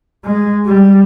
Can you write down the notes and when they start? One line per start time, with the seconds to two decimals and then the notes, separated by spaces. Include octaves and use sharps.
0.25 G#3
0.67 G3